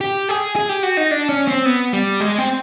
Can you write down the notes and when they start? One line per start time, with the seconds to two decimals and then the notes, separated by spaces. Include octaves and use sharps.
0.01 G4
0.29 G#4
0.56 G#4
0.69 G4
0.83 F#4
0.97 D#4
1.11 D4
1.29 C#4
1.48 C4
1.66 B3
1.93 G3
2.20 G#3
2.38 C4